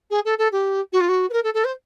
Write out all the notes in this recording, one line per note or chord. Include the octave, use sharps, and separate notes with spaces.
G#4
A4
A4
G4
F#4
F4
F#4
B4
A#4
A4
A4
C5